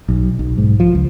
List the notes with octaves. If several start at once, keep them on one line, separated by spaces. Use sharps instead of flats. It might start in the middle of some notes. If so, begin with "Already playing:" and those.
B1
B1
G#2
F3
C#2